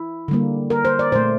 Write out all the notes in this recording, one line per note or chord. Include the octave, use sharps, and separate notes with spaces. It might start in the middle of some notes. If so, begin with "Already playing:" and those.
Already playing: E4
D3 G3 A#3
A#4
C5
D5
A#2 A3 C5